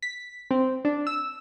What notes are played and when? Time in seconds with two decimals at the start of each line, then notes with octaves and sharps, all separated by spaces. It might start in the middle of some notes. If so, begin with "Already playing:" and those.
0.02 B6
0.51 C4
0.85 D4
1.07 E6